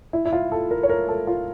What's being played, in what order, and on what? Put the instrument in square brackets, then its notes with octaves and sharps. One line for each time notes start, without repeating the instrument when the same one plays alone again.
[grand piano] E4
E4
F4
A4
A#4
C#5
A#4
A4
F4